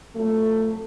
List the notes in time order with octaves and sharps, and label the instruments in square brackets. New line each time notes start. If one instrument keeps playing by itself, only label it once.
[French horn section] F2 F#3 A3